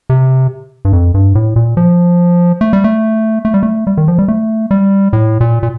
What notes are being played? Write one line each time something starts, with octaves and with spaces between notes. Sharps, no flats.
C3
G2
F2
G2
A2
A#2
F3
A3
G3
A3
A3
G3
A3
G3
D#3
F3
G3
A3
G3
A2
A#2
A#2